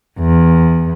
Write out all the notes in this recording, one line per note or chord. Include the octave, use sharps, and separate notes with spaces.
E2